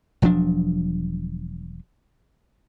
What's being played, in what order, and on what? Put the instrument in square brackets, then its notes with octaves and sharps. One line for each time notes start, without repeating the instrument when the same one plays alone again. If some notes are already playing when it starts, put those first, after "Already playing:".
[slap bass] E1 F3 F#3 D4